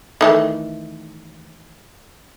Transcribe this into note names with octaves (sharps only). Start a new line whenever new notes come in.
D#3 E3 A3